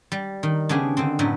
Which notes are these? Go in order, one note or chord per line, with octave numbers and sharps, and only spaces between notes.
G3
D#3
C#3 B3 D4 G4 G#4
D3 D#3 C4
F#2 A2 D3 B3 G4